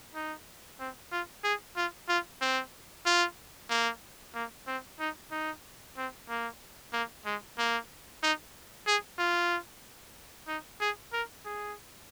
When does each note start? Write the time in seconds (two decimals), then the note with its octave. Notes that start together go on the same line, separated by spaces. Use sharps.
0.15 D#4
0.80 C4
1.12 F4
1.44 G#4
1.76 F4
2.08 F4
2.41 C4
3.06 F4
3.70 A#3
4.35 A#3
4.67 C4
5.00 D#4
5.31 D#4
5.97 C4
6.29 A#3
6.93 A#3
7.26 G#3
7.58 A#3
8.23 D#4
8.87 G#4
9.19 F4
10.48 D#4
10.80 G#4
11.13 A#4
11.45 G#4